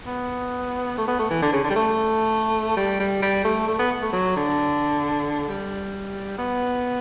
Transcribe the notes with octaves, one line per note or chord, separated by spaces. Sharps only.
B3
A3
B3
A3
E3
D3
C#3
D3
G3
A3
G3
G3
G3
A3
A3
B3
A3
F#3
D3
G3
B3